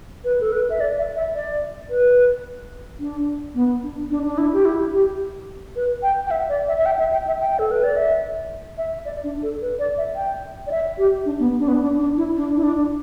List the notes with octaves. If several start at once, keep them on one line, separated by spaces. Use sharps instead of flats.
B4
A4
B4
E5
D5
E5
E5
D5
B4
D4
B3
D4
D4
D4
E4
G4
E4
G4
B4
G5
G5
E5
D5
E5
E5
G5
E5
G5
E5
G5
A4
B4
D5
E5
E5
D5
D4
A4
B4
D5
E5
G5
D5
E5
G4
D4
B3
D4
B3
D4
D4
E4
D4
E4
D4